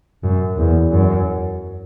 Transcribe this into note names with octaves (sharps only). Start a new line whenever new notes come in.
F#2
E2
F#2